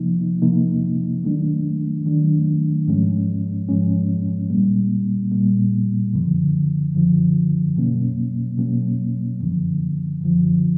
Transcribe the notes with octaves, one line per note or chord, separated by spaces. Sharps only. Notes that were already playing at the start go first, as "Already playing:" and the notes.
Already playing: C3 F3 A#3 D#4
C3 F3 A#3 D#4
D#3 F#3 A3 D4
D#3 F#3 A3 D4
G#2 F3 G#3 C#4
G#2 F3 G#3 C#4
A#2 G3 A#3
A#2 G3 A#3
F#2 D3 F3
F#2 D3 F3
B2 F#3 A#3 C#4
B2 F#3 A#3 C#4
F#2 D3 F3
F#2 D3 F3